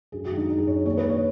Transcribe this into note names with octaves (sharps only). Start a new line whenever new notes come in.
F#2 G#4
F#4
D#3
D#4
F#2 D#4
G#4
F#2 C#5
D#2 C#5
B4
D#2
C#5